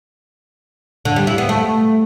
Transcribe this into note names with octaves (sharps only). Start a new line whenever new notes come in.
D3
G3
E4
B3
A3